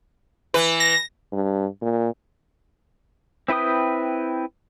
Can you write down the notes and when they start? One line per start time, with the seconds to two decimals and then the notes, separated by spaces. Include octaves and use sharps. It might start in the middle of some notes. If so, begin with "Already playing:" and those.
0.54 E3 B4
0.80 A#6
1.32 G2
1.82 A#2
3.48 C4 E4 B4 G5 D#6